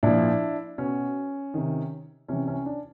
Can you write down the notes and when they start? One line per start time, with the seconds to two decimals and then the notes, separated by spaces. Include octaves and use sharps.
0.03 A#2 F3 D4 E4
0.78 B2 C#4
1.54 C3 D#3
2.28 C3 E3 C#4
2.47 C#4
2.66 D4